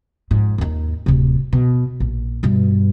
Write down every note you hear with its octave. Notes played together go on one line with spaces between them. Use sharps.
F2 G#2
D#2 D#4
D1 C3
B2
A#1
G2 B2